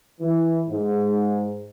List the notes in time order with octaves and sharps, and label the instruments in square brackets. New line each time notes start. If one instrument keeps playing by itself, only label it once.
[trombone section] E3
G#2